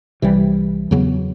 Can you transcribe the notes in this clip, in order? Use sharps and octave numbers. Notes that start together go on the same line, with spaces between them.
C2 C3 E3 G3
E2 C#3 F#3 B3